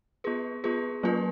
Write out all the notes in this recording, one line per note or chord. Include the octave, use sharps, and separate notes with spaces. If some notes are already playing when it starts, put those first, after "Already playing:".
B3 F4 G#4 B4
B3 F4 G#4 B4
F#3 A#3 C#4 F4 B4